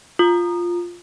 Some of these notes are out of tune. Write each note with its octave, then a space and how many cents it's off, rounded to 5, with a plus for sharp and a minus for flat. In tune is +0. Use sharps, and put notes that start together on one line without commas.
F4 +0 D#6 -25